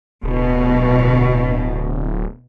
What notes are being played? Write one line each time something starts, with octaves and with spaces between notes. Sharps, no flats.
D1 B2